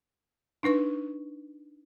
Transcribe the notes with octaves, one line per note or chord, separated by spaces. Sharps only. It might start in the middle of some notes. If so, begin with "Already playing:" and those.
D4 D#4 B4 C#6